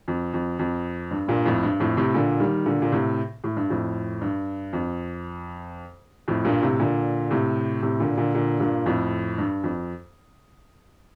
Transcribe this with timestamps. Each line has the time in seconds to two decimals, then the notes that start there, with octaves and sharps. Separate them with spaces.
0.08 F2
0.33 F2
0.59 F2
1.11 G2
1.28 G2 A#2
1.45 F2 A2
1.63 G2
1.80 F2 A2
1.97 A2 C3
2.14 A#2 D3
2.40 D#3 G3
2.66 A#2 D3
2.82 A#2
2.92 A2 C3
3.44 A2
3.57 G2
3.70 F2 A2
4.21 G2
4.73 F2
6.28 F2 A2
6.45 G2 A#2
6.62 A2 C3
6.79 A#2 D3
7.31 A2 C3
7.83 A2 C3
8.00 A#2 D3
8.17 A#2 D3
8.34 A#2 D3
8.60 G2 A#2
8.86 F2 A2
9.38 G2
9.64 F2